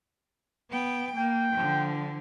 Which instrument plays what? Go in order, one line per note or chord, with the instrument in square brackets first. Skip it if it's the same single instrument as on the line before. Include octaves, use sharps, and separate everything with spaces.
[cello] B3 G5
[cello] A#3 [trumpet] G5
[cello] D3 F3